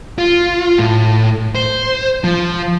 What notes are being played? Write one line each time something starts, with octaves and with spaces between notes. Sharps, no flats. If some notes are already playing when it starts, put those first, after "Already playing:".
F4
A2
C5
F3